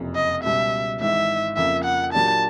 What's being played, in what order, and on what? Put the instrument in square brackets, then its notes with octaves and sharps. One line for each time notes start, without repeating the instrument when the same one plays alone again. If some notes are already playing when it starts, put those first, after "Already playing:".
Already playing: [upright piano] F#1 F2 C3
[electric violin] D#5
[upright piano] C#2 B2 G3 [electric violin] E5
[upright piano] G#1 G#2 E3 [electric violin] E5
[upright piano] F2 C#3 F3 A#3 [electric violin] E5
[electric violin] F#5
[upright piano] A#2 F#3 A#3 D4 G4 [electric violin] A5